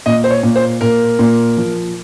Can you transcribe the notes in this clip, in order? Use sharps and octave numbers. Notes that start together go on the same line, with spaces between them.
A#2 D#5
C5
C#5
A#2
C5
A#2 A#4
A#2
F3